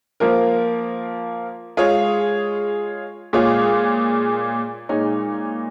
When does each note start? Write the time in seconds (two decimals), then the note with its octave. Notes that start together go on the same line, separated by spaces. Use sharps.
0.20 F3 A#3 F4 A#4
1.77 G#3 F4 G#4 C#5
3.33 A#2 G#3 F4 G#4 C#5
4.89 A#2 G#3 D#4 C#5